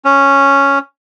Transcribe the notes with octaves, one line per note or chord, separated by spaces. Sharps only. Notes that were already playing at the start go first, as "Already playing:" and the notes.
C#4